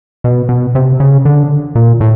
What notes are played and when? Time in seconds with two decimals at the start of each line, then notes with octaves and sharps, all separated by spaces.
0.24 B2
0.49 B2
0.75 C3
1.00 C#3
1.25 D3
1.75 A#2
2.00 A2